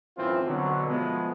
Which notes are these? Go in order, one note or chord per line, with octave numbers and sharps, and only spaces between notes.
F#2 A2 E3 C4 F4 C5
B2 D3 F#3
F3 G#3 A3 B3